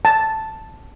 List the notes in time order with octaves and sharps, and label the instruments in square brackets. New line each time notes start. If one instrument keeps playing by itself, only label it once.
[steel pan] A5